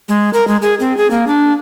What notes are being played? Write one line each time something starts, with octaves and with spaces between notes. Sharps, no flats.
G#3
A#4
G#3
G#4
C4
G#4
A#3
D4